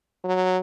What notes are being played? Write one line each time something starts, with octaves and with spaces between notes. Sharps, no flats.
F#3